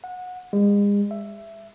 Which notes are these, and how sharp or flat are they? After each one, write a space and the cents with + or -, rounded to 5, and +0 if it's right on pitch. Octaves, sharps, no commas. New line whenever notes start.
F#5 -25
G#3 -40
E5 +10